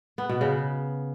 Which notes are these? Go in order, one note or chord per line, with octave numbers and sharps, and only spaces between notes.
B3
B2
C#3